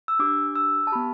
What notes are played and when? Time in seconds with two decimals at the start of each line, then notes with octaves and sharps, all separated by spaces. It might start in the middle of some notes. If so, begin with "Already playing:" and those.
0.08 E6
0.19 D4 G4 D6
0.56 E6
0.87 A5
0.92 B3 G4 B5